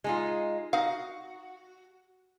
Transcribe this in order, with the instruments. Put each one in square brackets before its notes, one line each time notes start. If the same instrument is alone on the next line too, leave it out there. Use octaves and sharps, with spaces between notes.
[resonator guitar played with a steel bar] G#3 D#4 F4
[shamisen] D#4 F5 [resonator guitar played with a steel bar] F#4